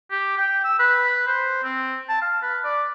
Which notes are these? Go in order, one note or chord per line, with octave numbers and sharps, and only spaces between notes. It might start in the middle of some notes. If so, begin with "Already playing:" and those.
G4
G5
E6
B4
C5
C4
A5
F5
B4
D5